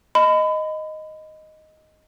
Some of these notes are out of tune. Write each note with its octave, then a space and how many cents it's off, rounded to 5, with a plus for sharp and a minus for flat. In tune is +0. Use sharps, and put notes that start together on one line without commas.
D#5 +0 B5 +30